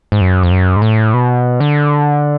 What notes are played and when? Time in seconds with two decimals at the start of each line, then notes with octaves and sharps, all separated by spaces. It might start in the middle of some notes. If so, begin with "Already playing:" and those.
0.12 G#2
0.21 F#2
0.43 F2
0.51 F#2
0.76 G#2
0.82 A2
1.14 B2
1.60 D3